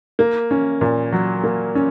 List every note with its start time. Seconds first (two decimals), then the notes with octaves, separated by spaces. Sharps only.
0.19 A#3
0.51 C#4
0.81 A#2
1.12 F#3
1.44 A#3
1.75 C#4